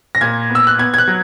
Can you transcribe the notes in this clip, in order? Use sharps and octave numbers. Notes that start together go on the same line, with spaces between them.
A#6
A#2 G#6
B3
E6
F#6
B3 G#6
G#6
F#6
F#3